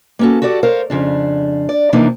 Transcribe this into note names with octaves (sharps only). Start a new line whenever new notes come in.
A#3 B3 C#4 F#4 A4
F#4 G4 A4 D5 F#5
A#4 C5 C#5 F5
F2 C#3 D4
D5
C3 E3 F3 A#3 D4 D#4